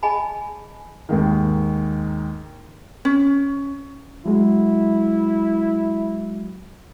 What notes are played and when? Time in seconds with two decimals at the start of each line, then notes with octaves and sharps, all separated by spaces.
0.03 G#4 D#5 G#5 A5 B5
1.09 D#2 G#2 D#3
3.05 C#4
4.26 F#3 G#3 E4 F#4